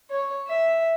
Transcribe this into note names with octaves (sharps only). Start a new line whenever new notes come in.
C#5
E5